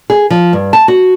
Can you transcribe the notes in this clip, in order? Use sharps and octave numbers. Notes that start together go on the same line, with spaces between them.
G#4
F3
G2
A5
F#4